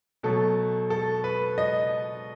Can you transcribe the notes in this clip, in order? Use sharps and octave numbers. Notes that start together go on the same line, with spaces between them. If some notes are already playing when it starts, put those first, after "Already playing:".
B2 F#3 A3 A4
A4
B4
D#5